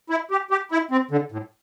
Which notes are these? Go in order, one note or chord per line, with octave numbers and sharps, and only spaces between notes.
E4
G4
G4
E4
C4
D3
A2